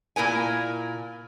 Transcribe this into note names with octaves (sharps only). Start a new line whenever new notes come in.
A#2 E4 A#4 G#5